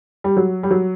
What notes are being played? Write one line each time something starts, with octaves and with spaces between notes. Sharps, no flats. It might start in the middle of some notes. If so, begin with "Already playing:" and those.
G3
F#3
G3
F#3